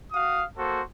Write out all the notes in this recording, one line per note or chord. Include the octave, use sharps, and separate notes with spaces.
F#4 F5 D#6
A#3 F#4 A4 C5